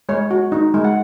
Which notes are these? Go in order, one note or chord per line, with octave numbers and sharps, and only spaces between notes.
G#3 C#5
F#4
D#4
G#3
F#5